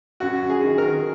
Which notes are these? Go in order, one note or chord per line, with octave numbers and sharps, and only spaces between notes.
F#2 F#4
G#4
D#3
A#4